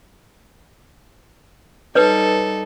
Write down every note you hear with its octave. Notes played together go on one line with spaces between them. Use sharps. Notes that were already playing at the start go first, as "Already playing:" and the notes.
G3 D#4 A4 B4 C#5